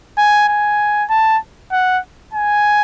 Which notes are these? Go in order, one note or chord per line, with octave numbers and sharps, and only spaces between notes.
G#5
G#5
A5
F#5
G#5